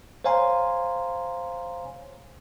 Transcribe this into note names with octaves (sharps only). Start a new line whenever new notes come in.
C5 C#5 F5 G#5 A#5 C6